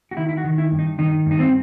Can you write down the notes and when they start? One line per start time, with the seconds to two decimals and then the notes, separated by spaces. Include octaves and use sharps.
0.11 F#4
0.17 D#3 E4
0.29 E4
0.37 F#4
0.44 D#3
0.58 E4
0.72 G2
0.79 D#4
0.98 D#3 D#4
1.26 G2 D#4
1.39 C4